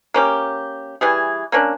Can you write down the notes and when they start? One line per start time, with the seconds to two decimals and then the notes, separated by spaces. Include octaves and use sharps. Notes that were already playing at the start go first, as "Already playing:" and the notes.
0.14 A#3 C#4 G4
1.01 E3 G3 G#4
1.52 A#3 C#4 D4